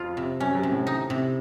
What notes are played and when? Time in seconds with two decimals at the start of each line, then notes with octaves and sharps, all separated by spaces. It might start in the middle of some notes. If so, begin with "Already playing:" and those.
Already playing: F2 F4
0.17 C3
0.40 F#2 C#4
0.55 F#2
0.63 C3
0.72 A2
0.87 D#4
1.10 C3